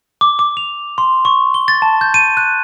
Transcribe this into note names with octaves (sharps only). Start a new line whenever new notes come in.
D6
D6
F7
C6
C#6
G7
A6
A5
G6
D#7
F#6